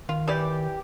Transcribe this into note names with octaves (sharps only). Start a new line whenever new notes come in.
D#3 F4
E3 G4 D5